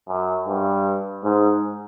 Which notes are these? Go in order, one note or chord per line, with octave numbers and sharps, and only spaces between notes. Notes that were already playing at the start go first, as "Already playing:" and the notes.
F#2
G2
G#2